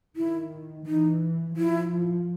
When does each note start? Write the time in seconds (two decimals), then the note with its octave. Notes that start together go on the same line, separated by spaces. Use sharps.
0.16 D#3 E4
0.86 E3 D#4
1.57 F3 E4